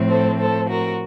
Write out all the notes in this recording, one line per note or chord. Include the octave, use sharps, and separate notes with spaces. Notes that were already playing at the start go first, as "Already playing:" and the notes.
Already playing: A2 F3 C4
A4 C5
A4 C5
F#4 A#4